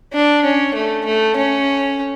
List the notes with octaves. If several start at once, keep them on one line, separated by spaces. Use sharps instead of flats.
D4
C#4
A3
A3
C#4